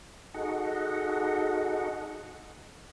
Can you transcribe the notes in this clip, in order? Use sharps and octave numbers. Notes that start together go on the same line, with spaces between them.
D#4 F#4 G#4 A4 D#5 F#5